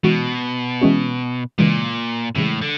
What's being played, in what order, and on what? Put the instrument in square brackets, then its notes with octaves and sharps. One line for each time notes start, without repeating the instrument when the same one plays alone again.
[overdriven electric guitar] B2 [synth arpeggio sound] E3 G#3 C#4 F#4
[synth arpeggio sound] E3 G#3 C#4 F#4
[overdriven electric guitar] A#2 [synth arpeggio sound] C#3 E3 G#3
[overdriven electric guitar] A2 [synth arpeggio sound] C#3 E3 G#3
[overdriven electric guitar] D3